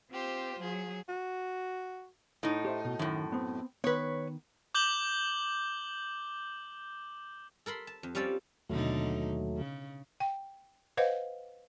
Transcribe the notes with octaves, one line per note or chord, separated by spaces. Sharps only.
C4 F4 G4 C5
F#3 G#4
F#4
A2 D#4
G4 C5 E5
B2
F#2 A2 D#3
B3 C4
D#3 B3 B4 C#5
D6 G6 F#7 G7
A4 A#4 B5 C6
A5
F2
G3 C#4 F4 A4 D5
D#2 B2 D3 F#3 A3 D#4
C#3
G5
B4 C5 D#5 F5 F#5